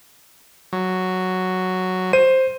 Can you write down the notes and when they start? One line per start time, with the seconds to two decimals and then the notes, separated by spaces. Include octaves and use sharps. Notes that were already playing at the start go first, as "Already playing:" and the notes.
0.73 F#3
2.13 C5 D#7